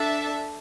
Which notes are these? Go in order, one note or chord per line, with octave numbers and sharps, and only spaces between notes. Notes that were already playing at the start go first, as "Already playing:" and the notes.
Already playing: D4 A4 E5 A5